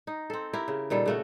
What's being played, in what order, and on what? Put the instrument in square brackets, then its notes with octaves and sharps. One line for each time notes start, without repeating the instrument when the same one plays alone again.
[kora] D#4
C4 A4
E4 G4 A#4
C#3
A#2 D#3 G3 A4
C#3 A3 F#4